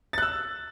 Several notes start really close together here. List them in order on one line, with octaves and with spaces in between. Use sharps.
A6 F#6 E6